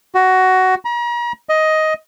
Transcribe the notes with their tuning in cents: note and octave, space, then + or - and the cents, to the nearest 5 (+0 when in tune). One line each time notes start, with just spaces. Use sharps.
F#4 +15
A#5 +40
D#5 +10